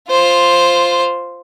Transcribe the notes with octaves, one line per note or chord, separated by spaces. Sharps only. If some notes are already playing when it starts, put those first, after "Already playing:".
F4 C5